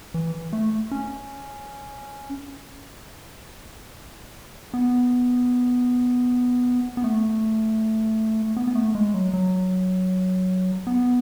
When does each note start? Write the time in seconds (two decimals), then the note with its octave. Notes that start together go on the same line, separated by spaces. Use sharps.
0.14 E3
0.53 A3
0.91 C#4
4.74 B3
6.97 B3
7.04 A3
8.57 B3
8.67 B3
8.75 A3
8.95 G#3
9.14 F#3
9.34 F#3
10.87 B3